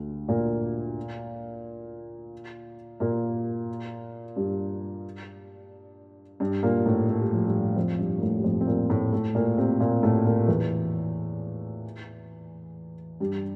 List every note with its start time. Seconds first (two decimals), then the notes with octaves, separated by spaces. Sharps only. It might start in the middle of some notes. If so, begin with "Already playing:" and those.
Already playing: D2 D3
0.28 A#2 A#3
3.00 A#2 A#3
4.36 G2 G3
6.40 G2 G3
6.63 A#2 A#3
6.86 A2 A3
7.09 A3
7.20 G3
7.33 F3
7.45 G2 G3
7.76 F2 F3
7.99 G2 G3
8.18 A#3
8.21 A2 A3
8.39 G3
8.44 F2 F3
8.61 C4
8.67 A#2 A#3
8.90 A2 A3
9.13 A2 A3
9.35 A#2 A#3
9.57 C3 C4
9.80 A#2 A#3
10.03 A2 A3
10.25 A#2 A#3
10.48 E2 E3
13.20 G2 G3